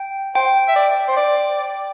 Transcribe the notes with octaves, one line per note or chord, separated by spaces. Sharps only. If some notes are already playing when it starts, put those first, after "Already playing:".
Already playing: G5
C5 G5
E5
D5
C5
D5